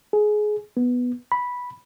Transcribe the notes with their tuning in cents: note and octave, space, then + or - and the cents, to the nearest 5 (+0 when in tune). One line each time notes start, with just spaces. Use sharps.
G#4 +20
B3 +0
B5 -5